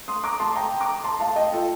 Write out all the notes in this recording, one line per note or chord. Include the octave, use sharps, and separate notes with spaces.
C6 D#6
A#5 D6
A5 C6
G5 A#5
A#5 D6
A5 C6
F5 A5
D#5 G5
F4 A4